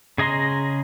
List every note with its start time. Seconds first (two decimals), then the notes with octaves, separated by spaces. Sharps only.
0.18 C#3 G#4 D#5 A#5 C6